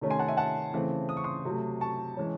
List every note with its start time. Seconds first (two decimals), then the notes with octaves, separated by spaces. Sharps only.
0.01 C3 D#3 A3 C#4
0.10 G#5 C6
0.19 F#5 A5
0.28 E5 G#5
0.37 F#5 A5
0.74 C#3 E3 A3 C4
1.09 D#6
1.17 C#6
1.24 C6 D#6
1.45 C3 F#3 A3
1.81 A5 C#6
2.17 E3 G#3 C#4